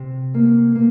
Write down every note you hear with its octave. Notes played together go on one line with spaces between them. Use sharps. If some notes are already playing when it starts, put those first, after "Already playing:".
Already playing: C3
A#3
A#3